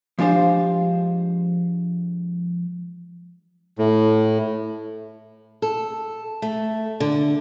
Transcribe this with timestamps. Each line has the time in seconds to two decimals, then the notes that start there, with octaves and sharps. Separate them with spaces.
0.19 F3 G#3 D4 G4 C5 F5
3.78 A2
5.62 A4
6.42 A3
7.00 D3